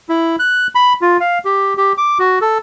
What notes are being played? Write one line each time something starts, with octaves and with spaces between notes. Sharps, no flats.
E4
F#6
B5
F4
F5
G4
G4
D6
F#4
A4